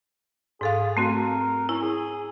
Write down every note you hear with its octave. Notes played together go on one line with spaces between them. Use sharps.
G#2 G#4 A4 F5
A3 C4 F#4 A#4
C#4 E4
G#4